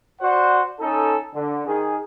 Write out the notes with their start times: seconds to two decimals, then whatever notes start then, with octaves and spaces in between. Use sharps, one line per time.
0.21 F#4 C5 D5 F#5
0.79 C#4 D#4 A4
1.34 D3
1.67 D#3 G#4